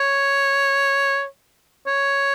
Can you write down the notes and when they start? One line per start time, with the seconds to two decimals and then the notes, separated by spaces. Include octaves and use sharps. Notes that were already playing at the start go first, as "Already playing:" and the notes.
Already playing: C#5
1.87 C#5